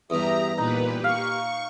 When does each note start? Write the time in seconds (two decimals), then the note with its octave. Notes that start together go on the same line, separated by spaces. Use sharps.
0.10 E2 G2 G4 E5 A#5 D#6
0.58 A#2 D#4 G4 B4
1.04 F5 C#6